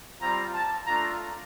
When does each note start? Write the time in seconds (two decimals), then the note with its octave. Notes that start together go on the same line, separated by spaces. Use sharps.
0.20 G3 C4 F4 A#5
0.54 A5
0.87 A3 D4 F4 A#5